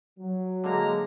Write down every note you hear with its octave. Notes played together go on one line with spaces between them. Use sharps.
F#3
D3 G#3 A#3 A#5